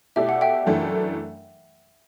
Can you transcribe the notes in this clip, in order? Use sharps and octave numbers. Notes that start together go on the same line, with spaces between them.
B2 A3 E4 G4 D5 E5
F#5
E5 G5
F#2 E3 A3 D4